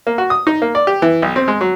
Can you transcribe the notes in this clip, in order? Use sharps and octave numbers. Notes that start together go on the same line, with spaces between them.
A#3
F#4
D#6
D#4
A#3
D5
G4
E3
B1
C4
G#3
F#3